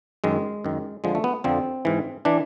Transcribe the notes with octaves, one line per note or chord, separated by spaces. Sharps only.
F#2 D#3 G#3
F#2 D#3
F2 D3 F3 G#3
A3
B3
F2 D3 F3 C4
G#2 E3
E3 D4